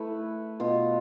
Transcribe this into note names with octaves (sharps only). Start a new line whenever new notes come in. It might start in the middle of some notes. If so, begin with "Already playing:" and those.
Already playing: A3 E4 B4
B2 B3 F4